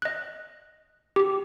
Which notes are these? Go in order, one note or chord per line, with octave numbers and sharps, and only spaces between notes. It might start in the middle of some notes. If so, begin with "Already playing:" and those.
D#5 F#6
G4